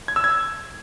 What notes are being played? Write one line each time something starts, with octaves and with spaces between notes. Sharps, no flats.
G#6
E6
G#6